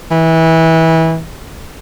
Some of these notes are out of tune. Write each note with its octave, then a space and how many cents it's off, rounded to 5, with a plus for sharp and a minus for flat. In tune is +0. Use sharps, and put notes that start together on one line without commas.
E3 -25